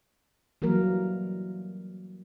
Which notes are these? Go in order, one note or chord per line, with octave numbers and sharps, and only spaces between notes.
E3 F#3 G3 A#3 A#4